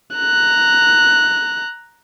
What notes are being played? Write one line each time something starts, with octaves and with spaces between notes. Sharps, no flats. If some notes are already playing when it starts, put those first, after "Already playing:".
A#5 F#6